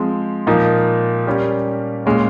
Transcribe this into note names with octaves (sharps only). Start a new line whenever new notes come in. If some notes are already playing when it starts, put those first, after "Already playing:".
Already playing: F3 G#3 C4
A#2 F3 A#3 D#4
G3 C#4 G4 A#4
A#2 G#3 C#4